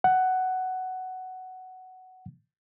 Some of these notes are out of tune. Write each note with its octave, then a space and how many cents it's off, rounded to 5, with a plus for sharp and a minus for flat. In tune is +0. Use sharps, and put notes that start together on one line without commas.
F#5 +10